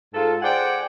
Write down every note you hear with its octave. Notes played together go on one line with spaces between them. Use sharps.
G#2 F4 A4
G#4 C5 D5 F#5 G5